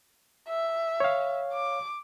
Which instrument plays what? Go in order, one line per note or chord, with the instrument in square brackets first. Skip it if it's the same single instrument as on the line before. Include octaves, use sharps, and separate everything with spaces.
[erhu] E5
[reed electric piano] C#5 F5
[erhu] D6